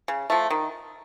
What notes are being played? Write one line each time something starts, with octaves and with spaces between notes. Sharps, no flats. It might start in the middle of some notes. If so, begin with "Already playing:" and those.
C#3
F3 A3
D#3